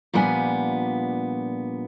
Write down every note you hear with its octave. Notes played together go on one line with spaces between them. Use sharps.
A#2 F3 G3 B3 D4 G#5